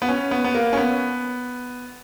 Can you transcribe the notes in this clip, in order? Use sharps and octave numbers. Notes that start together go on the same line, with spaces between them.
B3
C#4
B3
B3
A#3
C#4
B3